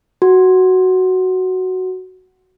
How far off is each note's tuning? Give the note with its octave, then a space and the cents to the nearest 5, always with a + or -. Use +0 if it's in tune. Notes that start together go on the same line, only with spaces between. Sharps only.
F#4 +5